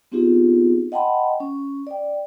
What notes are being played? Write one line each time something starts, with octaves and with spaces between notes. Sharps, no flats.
B3 C4 D#4 F4 G4 G#4
D#5 F#5 G5 A5 B5 C6
C#4
D5 G5